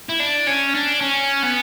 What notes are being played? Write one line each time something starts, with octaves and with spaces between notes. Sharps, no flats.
E4
D4
C#4
D4
C#4
B3